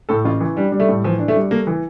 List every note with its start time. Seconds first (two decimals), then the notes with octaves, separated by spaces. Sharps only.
0.09 A2 A4
0.25 A1 F4
0.41 E3
0.56 G3 D4
0.72 G3
0.80 A3
0.89 A2
1.04 E3 F3
1.19 D4
1.28 A3
1.36 G3
1.51 A3 A#3
1.67 E3